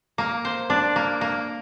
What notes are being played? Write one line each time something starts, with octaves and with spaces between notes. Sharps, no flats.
A#3
C5
D4
A#3
A#3